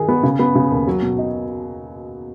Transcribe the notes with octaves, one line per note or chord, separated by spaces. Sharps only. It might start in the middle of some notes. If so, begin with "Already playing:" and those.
Already playing: D#3 G#4
B3
C#3
B3
C#3
D#2
F#3
B2
D#4